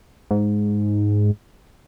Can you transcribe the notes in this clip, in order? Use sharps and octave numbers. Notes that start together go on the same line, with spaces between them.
G#2